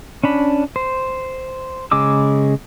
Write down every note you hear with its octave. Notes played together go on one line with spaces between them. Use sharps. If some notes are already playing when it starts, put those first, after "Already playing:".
C#4 D4 B5
C5
C#3 G#3 D6 E6